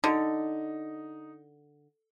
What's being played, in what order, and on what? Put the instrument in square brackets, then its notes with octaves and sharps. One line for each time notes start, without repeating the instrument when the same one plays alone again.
[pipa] D3 [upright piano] D#4